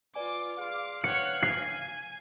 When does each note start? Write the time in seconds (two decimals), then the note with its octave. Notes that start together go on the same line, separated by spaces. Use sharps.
0.15 F4 B4 D5 G#5 D6
0.59 G#4 D5 F5 C6 D6
1.04 B4 C#5 F#5 G5 F#6 C#7
1.43 C#5 G#5 C7